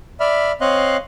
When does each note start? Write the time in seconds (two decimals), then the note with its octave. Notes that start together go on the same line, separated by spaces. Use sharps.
0.20 D5 E5 B5 F6
0.61 C4 C#5 D#5 F5 C6 F#6